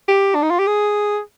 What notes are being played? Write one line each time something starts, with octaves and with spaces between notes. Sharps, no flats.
G4
D4
D#4
F4
G4
G#4